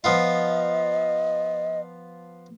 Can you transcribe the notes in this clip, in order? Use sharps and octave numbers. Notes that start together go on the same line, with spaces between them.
F3 B3 F4 D#5